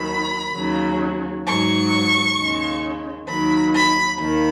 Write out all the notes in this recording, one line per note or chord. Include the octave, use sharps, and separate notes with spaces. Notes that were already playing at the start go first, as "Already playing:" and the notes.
Already playing: D#2 D#3 F#3 B5
D#2 C#3 F#3
G#2 F#3 C#6
D#2 C#3 G#3
D#2 D#3 F#3 B5
B5
D#2 D#3 B5